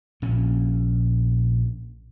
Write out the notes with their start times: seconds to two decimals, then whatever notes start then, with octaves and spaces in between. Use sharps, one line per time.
0.22 A#1 A#2 C#4